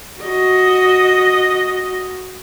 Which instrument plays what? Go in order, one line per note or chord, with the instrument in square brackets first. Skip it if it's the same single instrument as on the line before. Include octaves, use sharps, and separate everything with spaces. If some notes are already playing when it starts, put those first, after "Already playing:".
[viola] F#4 D#5